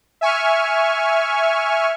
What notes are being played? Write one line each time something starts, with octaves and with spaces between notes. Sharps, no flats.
E5 G#5 C#6 F6